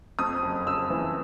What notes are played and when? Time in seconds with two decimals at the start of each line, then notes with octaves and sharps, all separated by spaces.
0.19 F2 D#6
0.42 F#1
0.66 C#3 E6
0.90 E3